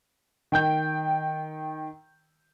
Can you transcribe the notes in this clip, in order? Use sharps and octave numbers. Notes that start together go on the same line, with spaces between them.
D#3 G5 G6